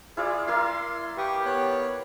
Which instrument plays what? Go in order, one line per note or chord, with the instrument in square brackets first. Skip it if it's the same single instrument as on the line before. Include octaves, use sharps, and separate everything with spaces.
[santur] E4 F4 D5 [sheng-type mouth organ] G#4
[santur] A#3 E4 F5 [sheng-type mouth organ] C6
[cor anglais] G4 [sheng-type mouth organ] B4 C#6 D#6
[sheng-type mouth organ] B3 C#5 F#6